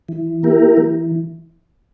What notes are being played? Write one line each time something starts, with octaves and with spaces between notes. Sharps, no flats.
E3
A#3 E4 G4 A#4
E3